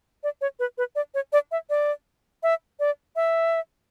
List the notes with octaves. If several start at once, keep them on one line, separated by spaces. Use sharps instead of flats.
D5
C#5
B4
B4
D5
C#5
D5
E5
D5
E5
D5
E5